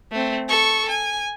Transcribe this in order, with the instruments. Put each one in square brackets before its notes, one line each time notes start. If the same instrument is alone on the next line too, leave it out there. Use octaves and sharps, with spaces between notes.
[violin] A3 C4
A4 C#6
G#5